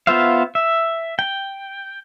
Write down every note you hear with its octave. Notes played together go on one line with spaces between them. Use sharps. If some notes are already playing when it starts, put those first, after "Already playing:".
B3 F4 C5 E5 F5
E5
G5